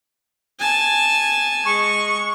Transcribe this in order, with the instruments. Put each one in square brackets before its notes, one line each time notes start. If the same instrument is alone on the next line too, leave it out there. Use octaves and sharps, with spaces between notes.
[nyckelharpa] G#5 A5
[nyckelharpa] G#3 [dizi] C#6